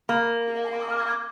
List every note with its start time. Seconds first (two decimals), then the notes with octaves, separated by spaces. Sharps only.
0.09 A#3